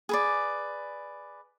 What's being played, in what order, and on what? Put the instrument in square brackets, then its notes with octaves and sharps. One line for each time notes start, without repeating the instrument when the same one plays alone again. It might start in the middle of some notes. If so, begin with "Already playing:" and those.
[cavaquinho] G#4 B4 D5